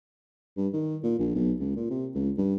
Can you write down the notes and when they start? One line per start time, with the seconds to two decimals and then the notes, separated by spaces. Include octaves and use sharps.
0.57 G2
0.73 D#3
1.03 A#2
1.19 A#1
1.35 B1
1.59 C#2
1.76 A#2
1.90 C3
2.15 C#2
2.38 G2